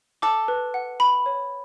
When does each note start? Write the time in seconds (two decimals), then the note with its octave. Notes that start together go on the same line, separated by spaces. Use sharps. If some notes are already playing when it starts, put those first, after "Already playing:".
0.22 A4 D6
0.48 B4
0.74 F#5
1.00 B5
1.26 C#5